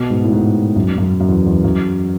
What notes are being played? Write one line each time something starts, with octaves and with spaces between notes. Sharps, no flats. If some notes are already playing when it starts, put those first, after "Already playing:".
Already playing: B2
G#2
A2
G#2
F#2
F#2
F#2
E2
E2
F#2